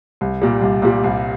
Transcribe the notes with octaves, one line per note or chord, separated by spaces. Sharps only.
C2
A#2 G3
C2
A#2 G3
C2